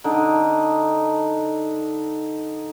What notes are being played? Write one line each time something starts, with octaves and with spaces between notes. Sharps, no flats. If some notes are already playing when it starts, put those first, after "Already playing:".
D3 D#4